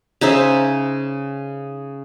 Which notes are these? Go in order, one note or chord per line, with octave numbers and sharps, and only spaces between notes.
C#3 D#4 C5 E5